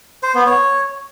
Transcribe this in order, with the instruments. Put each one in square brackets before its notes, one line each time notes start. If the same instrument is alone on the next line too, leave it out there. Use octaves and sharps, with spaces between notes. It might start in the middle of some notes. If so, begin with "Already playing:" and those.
[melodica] C5
B3
C#5